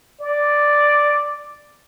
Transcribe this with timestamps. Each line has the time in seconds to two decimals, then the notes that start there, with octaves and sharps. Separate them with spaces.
0.21 D5